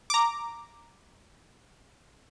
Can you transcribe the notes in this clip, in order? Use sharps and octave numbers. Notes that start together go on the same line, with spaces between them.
A#5 D6